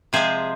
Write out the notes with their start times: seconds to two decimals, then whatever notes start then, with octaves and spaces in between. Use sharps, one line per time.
0.13 C3 F3 G#3 G#4 C5